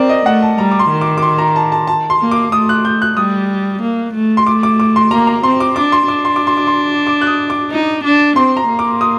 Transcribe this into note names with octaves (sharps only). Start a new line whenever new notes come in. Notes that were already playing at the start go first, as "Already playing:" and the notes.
Already playing: C4 A#4 D5
D#5
A3 F#5
A5
G3 A#5
D6
C6
D#3
D6
D6
C6
A#5
A5
A5
A5
C6
A#3
D6
A3 D#6
F#6
G6
F#6
G3 D#6
A#3
A3
C6
A3 D6
D6
D6
C6
A#3 A#5
A#5
C4 C6
D6
D4 D6
C6
D4 D6
C6
D6
C6
D6
C6
D6
F#6
D#6
D6
D#4
D4
C4 C6
A#5
A#3
D6
D#6